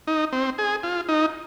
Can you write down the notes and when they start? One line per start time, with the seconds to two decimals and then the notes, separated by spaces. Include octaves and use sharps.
0.07 D#4
0.32 C4
0.58 G#4
0.83 F4
1.09 D#4